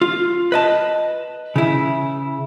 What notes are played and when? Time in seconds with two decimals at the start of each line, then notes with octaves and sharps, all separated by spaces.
0.01 F4
0.52 B4 D#5 A5
1.56 C#3 E4